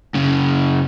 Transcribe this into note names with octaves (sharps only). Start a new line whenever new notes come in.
F#2 C#3